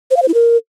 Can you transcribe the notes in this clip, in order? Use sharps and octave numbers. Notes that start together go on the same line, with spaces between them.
C5
F5
C5
E4
A#4